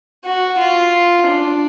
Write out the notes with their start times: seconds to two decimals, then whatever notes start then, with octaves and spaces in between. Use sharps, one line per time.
0.25 F#4
0.59 F4
1.27 D4